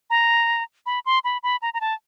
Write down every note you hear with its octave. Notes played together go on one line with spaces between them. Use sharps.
A#5
B5
C6
B5
B5
A#5
A#5
A5